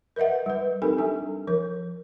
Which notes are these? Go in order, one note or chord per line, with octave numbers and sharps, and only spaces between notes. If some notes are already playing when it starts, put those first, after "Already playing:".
A#4 B4 D#5 E5 F#5
G3 B4
C4 D#4 G4 A4 A#4 G#5
G3 D4 A4
F3 A#4